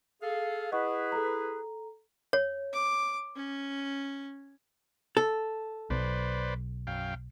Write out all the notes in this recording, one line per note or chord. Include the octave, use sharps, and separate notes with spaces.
G#4 A4 F5
E4 G#4 B4 D#5 F#5 C#6
A4 A#5
C#5
D6
C#4
A4
B1 B4 C5 D5
F#2 F5 G5